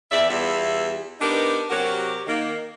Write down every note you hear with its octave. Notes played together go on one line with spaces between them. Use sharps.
E2 D5 E5
E2 G3 B3 E4 F4 E5
B3 D4 D#4 G4 A#4 B4
C3 F#3 F#4 G4 A#4
D#3 A#3